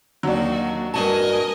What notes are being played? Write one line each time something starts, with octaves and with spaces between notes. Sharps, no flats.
D#2 F#3 D4 F#4
G2 F#4 A#4 D#5 G#5 A5